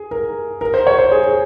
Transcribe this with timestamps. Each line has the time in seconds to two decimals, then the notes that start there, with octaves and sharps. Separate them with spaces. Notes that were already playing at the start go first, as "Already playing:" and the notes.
Already playing: G#4
0.11 A#4
0.61 A#4
0.74 C5
0.87 C#5
0.99 C5
1.12 G#4
1.28 G#4